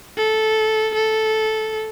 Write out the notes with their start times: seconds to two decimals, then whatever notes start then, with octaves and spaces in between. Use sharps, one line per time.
0.17 A4
0.95 A4